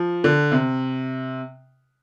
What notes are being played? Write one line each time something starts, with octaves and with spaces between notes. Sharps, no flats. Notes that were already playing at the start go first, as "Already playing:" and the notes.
Already playing: F3
D3
C3